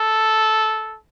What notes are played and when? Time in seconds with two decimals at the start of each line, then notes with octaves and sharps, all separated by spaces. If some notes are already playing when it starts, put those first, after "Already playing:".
Already playing: A4